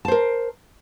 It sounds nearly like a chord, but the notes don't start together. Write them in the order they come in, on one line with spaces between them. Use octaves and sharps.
A5 C5 A#4